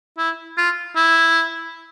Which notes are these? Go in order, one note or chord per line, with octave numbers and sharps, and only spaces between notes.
E4
F4
E4